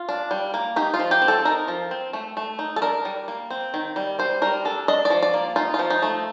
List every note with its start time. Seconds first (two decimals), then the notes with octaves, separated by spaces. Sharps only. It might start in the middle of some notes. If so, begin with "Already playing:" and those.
Already playing: F4
0.09 D4
0.31 G3
0.54 A#3
0.76 D#4 G4
0.94 F4
1.00 F3
1.11 G4
1.22 C4
1.28 A4
1.45 D#4 A#4
1.68 F3
1.91 C4
2.13 A3
2.37 A3
2.59 D#4
2.76 A4
2.82 D4 A#4
3.05 G3
3.28 A#3
3.50 C4
3.74 D#3
3.96 G3
4.19 G3 C5
4.42 G3 A#4
4.65 D4 A4
4.88 D4 D#5
5.05 D5
5.10 F3
5.22 D5
5.33 A#3
5.56 D#4 F4
5.74 F4
5.79 F3
5.90 D#4
6.02 A3